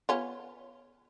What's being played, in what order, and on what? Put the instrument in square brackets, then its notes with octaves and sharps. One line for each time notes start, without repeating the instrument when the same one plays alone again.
[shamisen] B3 C#4 F4